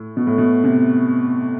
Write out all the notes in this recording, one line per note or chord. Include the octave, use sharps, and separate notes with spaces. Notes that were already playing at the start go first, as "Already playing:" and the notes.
Already playing: A2
B2
A2
B2
C3